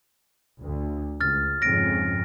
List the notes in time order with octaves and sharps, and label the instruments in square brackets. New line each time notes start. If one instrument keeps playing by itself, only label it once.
[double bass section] D2
[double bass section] C#2 [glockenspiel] F6 A6
[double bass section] F2 G#2 C#3 [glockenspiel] A#6 D7